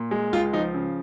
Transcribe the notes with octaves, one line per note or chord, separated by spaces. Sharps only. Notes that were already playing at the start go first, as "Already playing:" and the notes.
Already playing: A#2
G#3
C#2 F4
F3 D#4
C#3